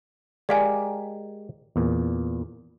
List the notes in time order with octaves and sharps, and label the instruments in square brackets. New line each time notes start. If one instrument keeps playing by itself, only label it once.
[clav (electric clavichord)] G#3 G4 A#4 [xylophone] D5 F5 G#5
[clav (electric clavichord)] E2 A#2